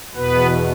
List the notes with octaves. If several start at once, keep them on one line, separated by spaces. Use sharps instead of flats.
E2 B2 B3 B4